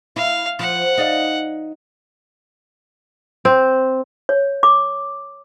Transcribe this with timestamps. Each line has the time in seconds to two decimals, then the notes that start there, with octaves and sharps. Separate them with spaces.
0.16 E4 F5
0.59 F3 F#5
0.98 D#4 D5 F5
3.45 C4
4.29 C#5
4.63 D6